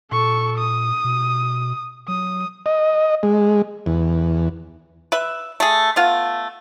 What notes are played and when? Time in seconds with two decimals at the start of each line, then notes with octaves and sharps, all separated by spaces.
0.12 A#2 A4 C#6
0.58 D#6
1.04 B2
2.08 F#3 D#6
2.66 D#5
3.23 G#3
3.86 E2
5.12 B4 E5
5.60 A3 G#4
5.96 A3 B3 F4